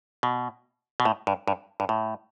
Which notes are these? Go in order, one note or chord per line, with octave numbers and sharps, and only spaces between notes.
B2
B2
A2
G2
G2
G2
A2